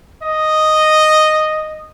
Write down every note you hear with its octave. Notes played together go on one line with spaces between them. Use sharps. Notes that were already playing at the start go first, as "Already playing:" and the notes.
D#5